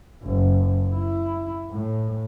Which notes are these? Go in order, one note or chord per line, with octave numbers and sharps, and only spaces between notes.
F#1
E4
A2